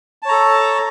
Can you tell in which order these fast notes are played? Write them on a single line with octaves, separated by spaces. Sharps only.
A5 C#5 A#5 A4